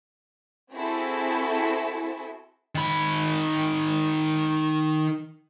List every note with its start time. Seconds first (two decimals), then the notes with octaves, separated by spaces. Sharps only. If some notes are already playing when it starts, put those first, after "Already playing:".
0.73 C4 E4 F#4 G#4 A4
2.75 D#3 B5